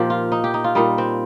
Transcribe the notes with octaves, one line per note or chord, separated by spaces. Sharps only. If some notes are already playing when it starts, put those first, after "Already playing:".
Already playing: A#2 F3 D#4 G4
F4
D#4
G4
D#4
F4
A#2 G3 D#4
C4